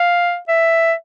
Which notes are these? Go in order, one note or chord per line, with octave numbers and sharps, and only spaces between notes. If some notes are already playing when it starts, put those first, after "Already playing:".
Already playing: F5
E5